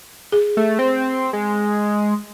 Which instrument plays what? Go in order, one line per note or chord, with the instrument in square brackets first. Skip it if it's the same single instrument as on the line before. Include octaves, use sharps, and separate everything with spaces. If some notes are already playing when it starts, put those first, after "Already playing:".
[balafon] G#4
[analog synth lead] A3
C4
G#3